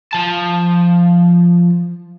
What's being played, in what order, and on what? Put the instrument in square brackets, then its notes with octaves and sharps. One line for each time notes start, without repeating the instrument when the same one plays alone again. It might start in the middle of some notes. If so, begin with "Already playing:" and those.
[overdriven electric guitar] F3 A5